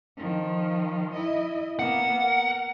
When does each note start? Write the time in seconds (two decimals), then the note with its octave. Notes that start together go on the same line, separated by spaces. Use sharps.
0.17 D#3 F3
1.14 E4 D#5
1.79 A#3 B3 F#5
2.19 A#4